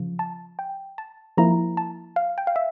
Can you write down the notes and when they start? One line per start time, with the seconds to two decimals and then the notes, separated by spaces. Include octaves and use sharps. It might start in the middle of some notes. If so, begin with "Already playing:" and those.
Already playing: C#3 F3 F4
0.19 A5
0.59 G5
0.98 A5
1.37 F3 A#3 E4 A#5
1.77 A5
2.16 F5
2.38 G5
2.47 F5
2.56 E5